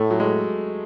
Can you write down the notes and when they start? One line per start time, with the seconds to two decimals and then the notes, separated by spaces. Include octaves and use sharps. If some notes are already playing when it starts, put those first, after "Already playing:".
Already playing: A2 A3
0.11 F#3
0.20 G#3